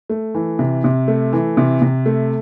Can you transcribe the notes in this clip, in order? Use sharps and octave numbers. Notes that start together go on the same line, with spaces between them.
A3
E3
C3
C3
A3
E3
C3
C3
A3